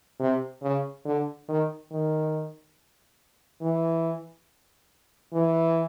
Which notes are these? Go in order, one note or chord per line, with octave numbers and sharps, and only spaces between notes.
C3
C#3
D3
D#3
D#3
E3
E3